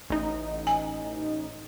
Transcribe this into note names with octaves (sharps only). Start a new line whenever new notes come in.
A1 D#4
G#5